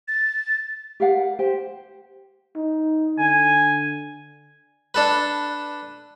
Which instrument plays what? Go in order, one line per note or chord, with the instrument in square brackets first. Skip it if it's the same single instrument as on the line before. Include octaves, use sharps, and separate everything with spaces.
[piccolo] A6
[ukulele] G4 A#4 F5 F#5
G4 C5 G5
[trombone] D#4
[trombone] D3 [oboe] G#5
[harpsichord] D4 A4 B4